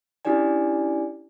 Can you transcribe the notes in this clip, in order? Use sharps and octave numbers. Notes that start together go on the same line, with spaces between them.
C#4 D4 E4 G4 D5 G#5